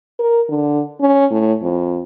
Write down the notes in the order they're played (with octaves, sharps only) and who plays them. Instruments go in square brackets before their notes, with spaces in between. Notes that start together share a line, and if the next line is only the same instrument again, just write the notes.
[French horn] A#4
D3
C#4
A2
F2